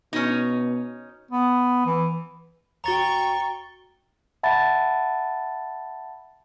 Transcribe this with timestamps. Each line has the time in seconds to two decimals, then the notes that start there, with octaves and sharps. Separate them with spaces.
0.13 B2 C#4 D#4
1.31 B3
1.86 E3
2.84 D#2 F#4 G5 A#5 C#6 A6 G7
4.43 E5 F#5 A5 B5 A6